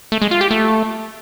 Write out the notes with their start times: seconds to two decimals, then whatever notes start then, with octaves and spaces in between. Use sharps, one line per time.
0.12 A3
0.22 G#3
0.31 F4
0.41 G4
0.51 A3